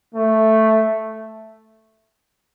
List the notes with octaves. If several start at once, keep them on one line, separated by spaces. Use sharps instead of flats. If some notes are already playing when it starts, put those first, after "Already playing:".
A3